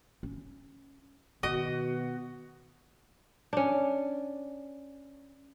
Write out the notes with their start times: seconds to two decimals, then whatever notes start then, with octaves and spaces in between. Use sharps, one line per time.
0.23 C#4
1.43 B2 D#3 F#4 D#5
3.53 C#4 D4